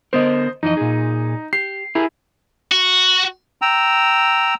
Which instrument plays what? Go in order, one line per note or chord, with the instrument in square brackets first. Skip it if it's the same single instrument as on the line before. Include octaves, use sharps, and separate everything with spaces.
[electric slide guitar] D3 B3 A#4 [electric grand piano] C5 D#5
[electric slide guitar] F2 E3 D#5 [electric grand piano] D#4
[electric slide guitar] A#2 G#4
[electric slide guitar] G4 [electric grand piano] C7
[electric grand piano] E4 [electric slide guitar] G4 G#4 A#4
[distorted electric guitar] F#4
[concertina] G5 A#5 E6